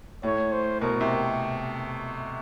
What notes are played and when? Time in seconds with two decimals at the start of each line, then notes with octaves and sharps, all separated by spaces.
0.23 A2 C#5
0.52 C5
0.81 B2 A#4
1.01 C3